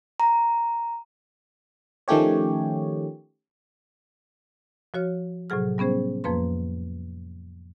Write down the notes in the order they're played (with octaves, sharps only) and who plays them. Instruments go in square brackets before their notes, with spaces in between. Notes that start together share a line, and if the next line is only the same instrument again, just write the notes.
[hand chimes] A#5
[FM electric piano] D#3 F3 A3 C#4 G4 C#5
[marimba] F3 F#4 C#5 F6
A2 C3 F#3 G#4 F6
G3 B3 C#4 G#4 C5
F2 F3 A#3 B4 C6